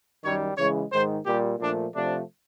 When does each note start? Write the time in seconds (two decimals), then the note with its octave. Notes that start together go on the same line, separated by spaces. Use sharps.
0.23 F#2 D#3 G3 C#5
0.56 C#3 E3 G#3 C#5
0.91 G#2 D#3 G#3 C5
1.26 A#2 G3 G4
1.59 A#2 F3 A3 D4
1.94 C3 F3 A3 D4